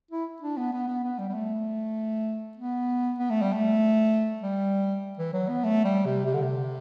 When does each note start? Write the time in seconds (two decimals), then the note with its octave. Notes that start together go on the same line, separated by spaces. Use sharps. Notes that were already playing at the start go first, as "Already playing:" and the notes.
0.11 E4
0.42 D4
0.57 B3
0.73 B3
0.88 B3
1.04 B3
1.19 G3
1.29 G3
1.34 A3
2.57 B3
3.19 B3
3.30 A3
3.42 G3
3.53 A3
4.42 G3
5.18 E3
5.33 F#3
5.49 B3
5.64 A3
5.84 G3
6.06 C3
6.26 C3
6.33 D3
6.42 C3